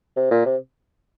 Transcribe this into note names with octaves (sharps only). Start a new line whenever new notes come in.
C3
A#2
C3